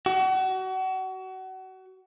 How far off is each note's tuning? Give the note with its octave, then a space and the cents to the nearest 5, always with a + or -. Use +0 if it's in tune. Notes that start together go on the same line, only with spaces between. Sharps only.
F#4 +30